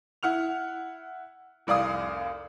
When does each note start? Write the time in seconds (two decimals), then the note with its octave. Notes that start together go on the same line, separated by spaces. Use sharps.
0.23 E4 F#5 F6 F7
1.67 F1 C2 D5 F5 D#6